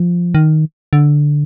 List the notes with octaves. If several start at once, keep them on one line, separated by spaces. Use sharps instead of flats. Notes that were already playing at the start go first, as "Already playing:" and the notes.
Already playing: F3
D#3
D3